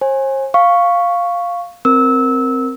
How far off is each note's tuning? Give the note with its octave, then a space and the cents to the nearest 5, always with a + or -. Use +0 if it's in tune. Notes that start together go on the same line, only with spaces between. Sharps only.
C5 +45 G#5 -10
F5 +0 C#6 +0
C4 +0 A#4 +0 E6 -20